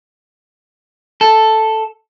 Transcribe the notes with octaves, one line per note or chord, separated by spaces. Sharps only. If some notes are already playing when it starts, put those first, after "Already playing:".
A4